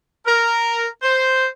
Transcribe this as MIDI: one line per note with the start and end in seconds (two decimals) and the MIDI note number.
0.25 0.86 70
1.03 1.46 72